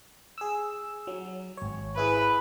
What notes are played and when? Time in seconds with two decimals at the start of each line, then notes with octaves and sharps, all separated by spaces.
0.38 G#4 E6
1.07 F#3
1.57 G#1 C#5
1.98 E4 G#4 B4